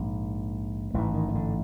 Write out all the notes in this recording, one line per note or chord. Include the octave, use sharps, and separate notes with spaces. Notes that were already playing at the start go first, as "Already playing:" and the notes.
Already playing: A#1 G#2
A1 G#2 E3
D#3
D#3
D3